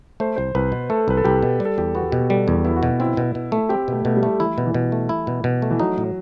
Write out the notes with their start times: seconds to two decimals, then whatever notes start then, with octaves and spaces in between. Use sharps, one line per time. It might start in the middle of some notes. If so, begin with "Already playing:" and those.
0.20 A3 C5
0.36 C2 C5
0.55 C2 B4
0.72 B2
0.90 A3 A4
1.08 C2 B4
1.17 A4
1.24 C2 G4
1.42 B2
1.60 G3
1.65 A4
1.78 E2 G4
1.95 B3 F#4
2.12 B2 G4
2.30 G3 A4
2.48 E2
2.65 B3 E4
2.76 F#4
2.83 B2
3.00 C4 E4
3.17 B2
3.35 B2
3.52 A3
3.69 C4 G4
3.88 B2 A3
4.05 B2 A3
4.17 G3
4.23 A3
4.40 E3 E4
4.58 B2
4.66 E3
4.74 B2
4.92 A3
5.09 E4
5.27 B2
5.44 B2
5.62 A3
5.71 E3
5.79 F#3 D#4
5.98 A2